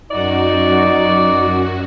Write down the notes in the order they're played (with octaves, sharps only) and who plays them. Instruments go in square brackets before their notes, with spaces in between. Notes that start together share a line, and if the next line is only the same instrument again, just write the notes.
[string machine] F#2 F#4 [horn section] D#4 D5